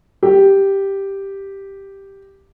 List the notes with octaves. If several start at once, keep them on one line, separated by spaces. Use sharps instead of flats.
G4